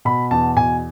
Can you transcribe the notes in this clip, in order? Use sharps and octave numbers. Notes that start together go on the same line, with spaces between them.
B2 B5
E2 A5
B2 G#5